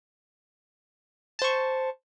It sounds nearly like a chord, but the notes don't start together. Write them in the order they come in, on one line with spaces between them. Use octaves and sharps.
A5 C5 C#6